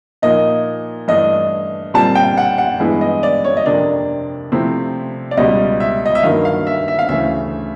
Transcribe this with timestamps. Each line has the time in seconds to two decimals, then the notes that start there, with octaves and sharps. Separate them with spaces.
0.22 A#2 F3 A#3 D#4 D#5
1.08 G2 E3 A3 D4 D#5
1.94 A#2 G3 C4 A5
2.15 G5
2.37 F#5
2.58 F#5
2.80 G2 E3 G#3 B3 E4
3.01 D#5
3.23 D5
3.45 C#5
3.57 D#5
3.66 F2 C3 F3 A#3 D4 D5
4.52 C3 F3 A3 C4 E4
5.31 D5
5.37 C#2 B2 G3 D#5
5.80 E5
6.06 D#5
6.15 E5
6.23 G2 D#3 F#3 A#3 F5
6.45 F5
6.67 E5
6.88 E5
6.99 F5
7.09 D2 C#3 E3 A3 E5